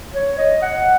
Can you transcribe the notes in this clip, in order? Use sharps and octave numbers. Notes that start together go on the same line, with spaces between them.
C#5
D#5
F#5